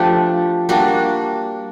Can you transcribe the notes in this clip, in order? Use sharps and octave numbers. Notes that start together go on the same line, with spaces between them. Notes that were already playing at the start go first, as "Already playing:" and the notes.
Already playing: F3 A3 D4 G4
G3 A#3 D4 F#4